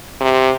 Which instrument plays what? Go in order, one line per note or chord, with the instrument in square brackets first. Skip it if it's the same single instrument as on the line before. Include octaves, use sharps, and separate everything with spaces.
[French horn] C3